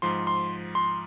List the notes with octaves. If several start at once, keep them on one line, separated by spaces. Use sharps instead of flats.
G#2 F3 C6
C6
C6